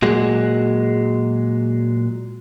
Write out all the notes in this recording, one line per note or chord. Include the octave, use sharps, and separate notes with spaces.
A#2 F#3 G#3